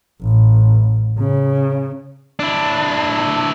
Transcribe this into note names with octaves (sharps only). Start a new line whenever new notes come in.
A1
C#3
D4 E4